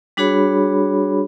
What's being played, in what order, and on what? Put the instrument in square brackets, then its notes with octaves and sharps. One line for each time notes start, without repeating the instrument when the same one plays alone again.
[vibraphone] G3 D4 F#4 G#4 C#5 B5